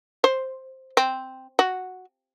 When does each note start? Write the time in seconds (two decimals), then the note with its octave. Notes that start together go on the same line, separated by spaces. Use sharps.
0.24 C5
0.97 C4
1.59 F#4